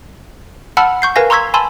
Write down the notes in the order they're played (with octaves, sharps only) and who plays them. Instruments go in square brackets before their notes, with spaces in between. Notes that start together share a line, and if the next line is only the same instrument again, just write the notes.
[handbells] F#5 A5 B5 E6 F6
C#6 G6 C7
A#4 B4 F5 G#5 A#6
A#5 C6 C#6 E6 G#6 B6
G#5 A5 B5 C6 E6